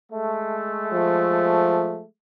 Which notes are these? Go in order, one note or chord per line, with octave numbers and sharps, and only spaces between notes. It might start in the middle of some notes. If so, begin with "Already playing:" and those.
G#3 A3
F3